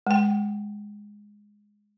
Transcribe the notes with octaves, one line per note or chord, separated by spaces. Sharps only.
G#3 G5